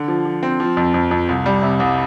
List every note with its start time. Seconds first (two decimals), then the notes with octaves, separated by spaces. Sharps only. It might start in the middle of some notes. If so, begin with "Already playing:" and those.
Already playing: D3
0.08 F3
0.25 F3
0.43 C4
0.60 F3
0.77 F2
0.94 F2
1.11 F2
1.29 C2
1.46 G3
1.62 C3
1.80 C2